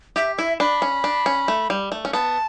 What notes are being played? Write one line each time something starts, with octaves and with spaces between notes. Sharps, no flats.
G4 E5
E4 E5
D4 B5
C#4
D4
C#4
A3
G3
A3
C#4
B3 A5